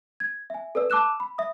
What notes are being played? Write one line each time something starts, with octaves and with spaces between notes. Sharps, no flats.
G#6
E5 G#5
A4 B4 D5 E6
A5 D6 E6 F#6 E7
B5
E5 D#6